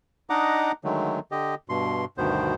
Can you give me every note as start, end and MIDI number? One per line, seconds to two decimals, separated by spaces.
0.30 0.72 62
0.30 0.72 63
0.30 0.72 75
0.30 0.72 78
0.30 0.72 82
0.30 0.72 86
0.84 1.19 50
0.84 1.19 51
0.84 1.19 54
0.84 1.19 56
0.84 1.19 57
1.31 1.55 50
1.31 1.55 67
1.31 1.55 75
1.69 2.05 43
1.69 2.05 47
1.69 2.05 84
2.18 2.55 38
2.18 2.55 43
2.18 2.55 47
2.18 2.55 51
2.18 2.55 59
2.18 2.55 72